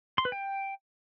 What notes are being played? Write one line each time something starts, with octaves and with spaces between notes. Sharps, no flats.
C6
B4
G5